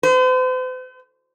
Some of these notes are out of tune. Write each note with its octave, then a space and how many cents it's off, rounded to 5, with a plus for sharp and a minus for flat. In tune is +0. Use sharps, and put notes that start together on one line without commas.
C5 -45